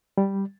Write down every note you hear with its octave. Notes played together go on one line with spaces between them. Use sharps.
G3